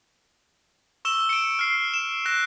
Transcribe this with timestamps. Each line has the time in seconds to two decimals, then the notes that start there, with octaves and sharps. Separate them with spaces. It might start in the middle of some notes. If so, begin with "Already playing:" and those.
1.05 C#6 E6 E7 G7
1.29 C#7 D7
1.59 F6 C7
1.94 E7
2.26 F#6 A#6 E7